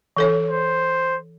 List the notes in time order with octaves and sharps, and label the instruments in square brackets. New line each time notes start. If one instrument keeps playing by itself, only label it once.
[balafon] E3 A4 C#5
[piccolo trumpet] C5